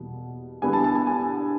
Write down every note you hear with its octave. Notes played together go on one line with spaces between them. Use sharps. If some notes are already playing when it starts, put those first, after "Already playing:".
Already playing: E2 B2 G3 A#3
D3 G3 B3 E4 G#5
A5
A5
G#5
G#5